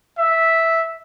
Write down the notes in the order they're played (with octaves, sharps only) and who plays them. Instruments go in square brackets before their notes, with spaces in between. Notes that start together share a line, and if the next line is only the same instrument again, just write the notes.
[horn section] E5